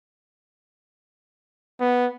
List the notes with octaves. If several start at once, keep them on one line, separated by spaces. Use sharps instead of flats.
B3